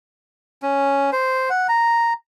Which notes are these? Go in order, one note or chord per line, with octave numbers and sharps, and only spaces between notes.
C#4
C5
F#5
A#5